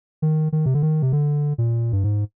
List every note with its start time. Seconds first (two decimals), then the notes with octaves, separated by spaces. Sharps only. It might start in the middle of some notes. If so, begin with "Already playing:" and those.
0.22 D#3
0.52 D#3
0.66 C3
0.74 D3
0.82 D#3
1.02 C3
1.12 D3
1.58 A#2
1.92 G2
2.04 G#2